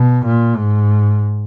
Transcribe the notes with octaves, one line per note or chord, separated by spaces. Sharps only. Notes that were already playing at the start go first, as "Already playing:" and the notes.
Already playing: B2
A#2
G#2